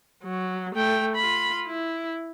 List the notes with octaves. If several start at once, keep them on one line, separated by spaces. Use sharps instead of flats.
F#3
A3 G5
F4 B5
E4